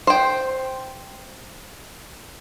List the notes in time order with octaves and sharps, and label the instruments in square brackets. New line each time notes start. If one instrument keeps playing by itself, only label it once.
[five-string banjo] C5 G5